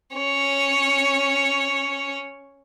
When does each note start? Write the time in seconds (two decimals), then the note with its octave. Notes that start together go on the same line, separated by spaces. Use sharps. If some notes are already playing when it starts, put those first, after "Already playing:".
0.16 C#4 C#5